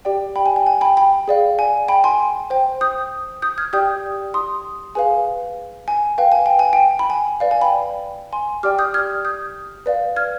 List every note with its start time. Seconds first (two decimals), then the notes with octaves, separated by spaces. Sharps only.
0.05 G4 D5 G5
0.36 G5 B5
0.46 G#5
0.56 G5
0.67 G#5
0.81 G5 B5
0.97 G5 B5
1.28 G#4 D5 F5
1.59 G#5
1.88 G5 B5
2.04 G#5 C6
2.50 C5 G5
2.81 D#6 G6
3.42 D#6 G6
3.58 F6 G#6
3.73 G4 D5 G5 D#6 G6
4.34 C6 D#6
4.95 G#4 B4 F5 G#5
5.88 G#5
6.18 B4 F5 G5
6.32 G#5
6.46 G5
6.59 G#5
6.73 G5
6.99 B5
7.10 G#5
7.40 B4 D5 F5
7.51 G#5
7.61 G5 B5
8.33 G#5 C6
8.63 G4 D5 G5 D6 F6
8.78 D#6 G6
8.94 F6 G#6
9.25 D#6 G6
9.86 B4 D5 F5
10.16 F6 G#6